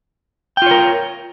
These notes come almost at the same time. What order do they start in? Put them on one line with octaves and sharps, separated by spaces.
G5 F4 C#5 A#4